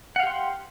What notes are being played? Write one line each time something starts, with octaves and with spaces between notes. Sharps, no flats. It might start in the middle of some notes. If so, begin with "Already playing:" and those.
G4 F5 F#5 C6